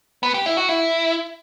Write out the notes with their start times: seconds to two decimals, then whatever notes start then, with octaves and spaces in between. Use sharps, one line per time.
0.23 B3
0.34 G4
0.46 E4
0.57 F#4
0.69 E4